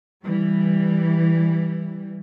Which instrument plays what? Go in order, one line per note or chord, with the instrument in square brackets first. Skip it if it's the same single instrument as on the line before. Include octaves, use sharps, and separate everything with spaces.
[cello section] E3 G3